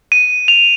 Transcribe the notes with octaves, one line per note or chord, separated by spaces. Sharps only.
D#7
F7